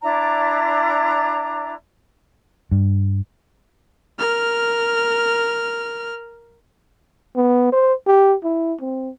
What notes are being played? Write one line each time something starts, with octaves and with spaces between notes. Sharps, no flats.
D4 E4 D5 A#5
G2
A#4 F6
B3
C5
G4
E4
C4